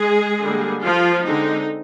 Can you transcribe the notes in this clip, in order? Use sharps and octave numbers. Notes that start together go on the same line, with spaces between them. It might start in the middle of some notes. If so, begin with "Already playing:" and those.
Already playing: G#3 G#4
D3 G3 A#3
F3 F4
D3 G#3 C4 D#4